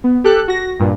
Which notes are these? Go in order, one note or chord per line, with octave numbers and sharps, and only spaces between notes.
B3
G4 A4 F#6
F#4 A#6
G2 A#2